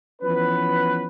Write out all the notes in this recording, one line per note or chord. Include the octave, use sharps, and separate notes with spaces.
E3 F3 B3 C#4 B4